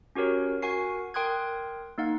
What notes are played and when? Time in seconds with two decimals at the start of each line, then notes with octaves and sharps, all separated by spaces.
0.15 C#4 F#4 G4 A#4 C#5
0.62 F#4 A#4 F#5 G#5 C#6 C7
1.14 A#4 G5 C6 D#6 F#6 G#6
1.98 A#3 D#4 F5 F#5